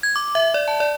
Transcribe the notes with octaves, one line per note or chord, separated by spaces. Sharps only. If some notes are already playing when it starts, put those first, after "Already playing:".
G#6
D6
E5
D5
A5
D5